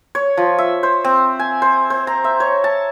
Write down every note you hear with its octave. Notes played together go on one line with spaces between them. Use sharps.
C#5
F3
E5
C5
C4
G#5
C5
C5
A#5
E5
C#5
A5